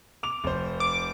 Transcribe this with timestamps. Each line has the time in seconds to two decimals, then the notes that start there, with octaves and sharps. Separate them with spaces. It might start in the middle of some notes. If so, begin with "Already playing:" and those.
0.23 D6 F7
0.44 F1 C5
0.80 D6